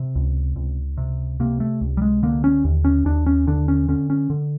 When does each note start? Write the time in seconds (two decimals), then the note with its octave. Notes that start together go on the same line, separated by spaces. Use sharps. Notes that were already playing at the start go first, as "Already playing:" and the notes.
Already playing: C3
0.15 C#2
0.56 C#2
0.97 C3
1.40 C3 A#3
1.60 A3
1.81 C#2
1.97 G3
2.02 G#3
2.23 D3 A#3
2.44 C#4
2.64 D#2
2.84 C#4
3.05 D#2 D4
3.26 C#4
3.47 D3 D4
3.68 C#4
3.88 D3 C#4
4.10 C#4
4.30 D3